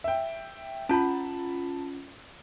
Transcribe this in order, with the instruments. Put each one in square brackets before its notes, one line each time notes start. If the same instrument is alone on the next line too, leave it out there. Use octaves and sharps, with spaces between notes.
[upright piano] E5 G5
[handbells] C#4 F4 [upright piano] A5 B5